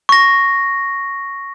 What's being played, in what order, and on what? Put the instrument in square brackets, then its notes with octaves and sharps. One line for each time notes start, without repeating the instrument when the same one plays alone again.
[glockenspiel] C#6 A#6